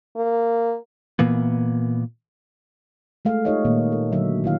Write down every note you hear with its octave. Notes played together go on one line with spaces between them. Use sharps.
A#3
A#2 E3 A#3 B3
G#3 A3 F5
D#4 F4 G4 C#5 D#5 F5
A#2 D#3 A#3
A4
D3 F#3 E5
D#3 E4 F5